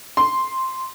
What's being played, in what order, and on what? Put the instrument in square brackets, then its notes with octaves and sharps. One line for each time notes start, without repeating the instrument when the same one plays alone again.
[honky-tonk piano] C6